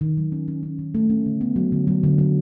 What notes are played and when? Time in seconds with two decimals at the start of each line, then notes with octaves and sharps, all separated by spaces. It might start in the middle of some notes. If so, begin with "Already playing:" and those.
0.01 D#3
0.17 F#3
0.32 C#4
0.48 C#4
0.63 C#4
0.79 D#3
0.95 A3
1.10 C#4
1.26 D3
1.41 B3
1.56 F#3
1.72 D3
1.87 F#3
2.03 D3
2.18 F#3